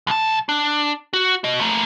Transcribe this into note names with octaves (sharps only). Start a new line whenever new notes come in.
B1 A5
D4
F#4
F#4 D#5
A3 A#3